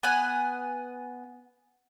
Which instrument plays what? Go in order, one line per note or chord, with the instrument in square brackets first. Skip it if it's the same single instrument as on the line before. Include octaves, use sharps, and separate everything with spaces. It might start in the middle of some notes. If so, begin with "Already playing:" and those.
[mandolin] B3 F#5 G#5